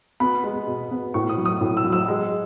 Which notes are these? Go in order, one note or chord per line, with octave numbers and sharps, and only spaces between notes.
B3 B5
G#3
B2
B3
A2 C#6
D#6
F#3
D#6
A2
E6
F#3
E6
G#3